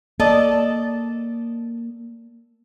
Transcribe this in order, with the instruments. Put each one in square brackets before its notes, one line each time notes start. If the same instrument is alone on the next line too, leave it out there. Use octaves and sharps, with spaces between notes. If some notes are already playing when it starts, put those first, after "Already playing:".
[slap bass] A#3 [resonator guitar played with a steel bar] A4 D5 D#5